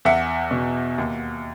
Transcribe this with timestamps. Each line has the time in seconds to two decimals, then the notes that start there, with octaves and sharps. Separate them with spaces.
0.05 E2 E5 F#5
0.51 B2
0.98 D#2